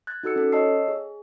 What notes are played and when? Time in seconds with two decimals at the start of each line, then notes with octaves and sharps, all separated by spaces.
0.07 F#6 G#6 A6
0.23 D#4 F#4 A4 E6 C#7
0.36 C#4 A4
0.52 C#5 D#5 A5 E6 C7
0.88 G#4